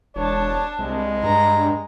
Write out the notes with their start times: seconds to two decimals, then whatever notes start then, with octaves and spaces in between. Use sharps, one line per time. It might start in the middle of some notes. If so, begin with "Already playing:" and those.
0.16 E1 D4 C#5 A5
0.79 C2 G#3
1.24 G2 A#5